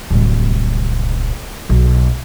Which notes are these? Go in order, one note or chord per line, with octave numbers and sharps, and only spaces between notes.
D1 C2
B1